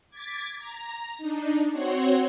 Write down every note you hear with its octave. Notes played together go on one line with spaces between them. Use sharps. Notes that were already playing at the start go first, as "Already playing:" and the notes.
D6 G#6 A6 B6
A#5
D4 D#4
C4 F#4 C#5 F#5 C6